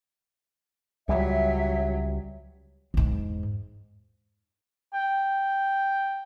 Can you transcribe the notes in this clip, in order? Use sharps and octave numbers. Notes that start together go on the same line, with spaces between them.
C#2 F#3 G3 E5
E2 G#2
G5